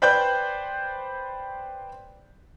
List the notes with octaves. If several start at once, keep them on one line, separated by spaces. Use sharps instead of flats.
B4 C5 D5 G5 F#6 G6